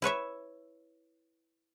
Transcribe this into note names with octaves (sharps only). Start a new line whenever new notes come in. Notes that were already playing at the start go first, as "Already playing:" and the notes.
E4 B4 C#5 E5